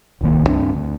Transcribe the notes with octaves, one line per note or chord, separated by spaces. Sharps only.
D1 C2 D#3 A#3
C#2 G2 C4 D4
D2